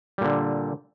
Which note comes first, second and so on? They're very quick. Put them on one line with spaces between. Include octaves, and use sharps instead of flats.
G3 A#2 D3